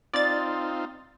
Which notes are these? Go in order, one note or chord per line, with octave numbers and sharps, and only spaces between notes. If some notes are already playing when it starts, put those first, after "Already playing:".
C4 D#4 F4 D5 A6